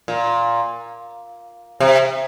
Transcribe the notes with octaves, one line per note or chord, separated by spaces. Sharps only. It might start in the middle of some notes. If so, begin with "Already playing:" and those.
A#2
C3